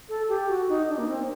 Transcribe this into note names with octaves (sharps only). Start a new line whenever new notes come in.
A4
G4
F#4
D#4
D4
A#3
C4